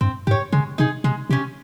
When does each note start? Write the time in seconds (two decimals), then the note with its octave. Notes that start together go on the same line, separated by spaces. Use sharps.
0.01 G2 C4
0.27 G#2 G4
0.31 C#5
0.52 C#3 G#3
0.78 C3 D#4 G#4
1.04 C3 G#3
1.30 C3 C#4 G4